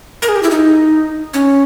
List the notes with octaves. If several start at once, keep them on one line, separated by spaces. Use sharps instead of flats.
A#4
G#4
G4
E4
D#4
C#4